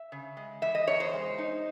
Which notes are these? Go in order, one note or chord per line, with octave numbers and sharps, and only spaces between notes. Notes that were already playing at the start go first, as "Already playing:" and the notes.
Already playing: E5
C#3
G#3
E3 E5
D#5
E2 C#5
C5
G#3
D#4